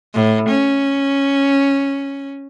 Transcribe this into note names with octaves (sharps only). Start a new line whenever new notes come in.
A2
C#4